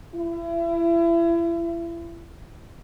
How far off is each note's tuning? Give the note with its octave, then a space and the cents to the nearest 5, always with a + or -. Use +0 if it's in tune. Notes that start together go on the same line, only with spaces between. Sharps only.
E4 +35